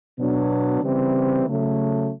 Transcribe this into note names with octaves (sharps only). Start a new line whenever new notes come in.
B2 F#3 B3 D4
C#3 E3 G3 C4
C#3 F#3 A3